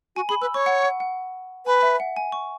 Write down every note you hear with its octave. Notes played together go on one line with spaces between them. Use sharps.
F#4 G#5
G#4 B5
B4 E6
C#5 C#6
F#5
F#5
F#5
B4 G#5
E5
F#5
G#5
C#6